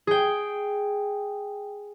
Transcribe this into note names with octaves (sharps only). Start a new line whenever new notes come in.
G#4 G5